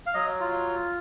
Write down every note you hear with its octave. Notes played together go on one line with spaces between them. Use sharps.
F5
F#3 D#5
F4